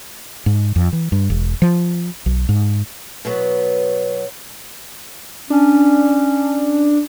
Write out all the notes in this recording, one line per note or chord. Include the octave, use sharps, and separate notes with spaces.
G#2
F2
E3
G2
E1
F3
B1
G#2
B2 F#3 B3
C#4 D4